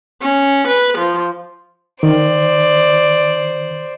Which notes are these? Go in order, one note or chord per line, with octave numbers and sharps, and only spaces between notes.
C#4
B4
F3
D#3 C5 D5